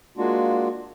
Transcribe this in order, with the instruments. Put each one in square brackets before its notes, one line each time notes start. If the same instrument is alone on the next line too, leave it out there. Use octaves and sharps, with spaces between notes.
[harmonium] G#3 A#3 D4 F4 F#4